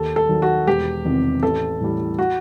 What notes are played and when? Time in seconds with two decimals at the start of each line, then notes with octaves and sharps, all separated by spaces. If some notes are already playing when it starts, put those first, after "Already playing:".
Already playing: D#2 A4
0.16 A4
0.29 D#3 F#3
0.42 F#4
0.67 E1 G4
1.05 E2 C3 D#3
1.43 A1 A4
1.80 A2 E3 G3
2.19 F#4